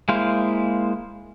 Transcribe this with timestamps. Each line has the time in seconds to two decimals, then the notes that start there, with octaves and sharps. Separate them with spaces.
0.09 G#3 A#3 E4 C5 F5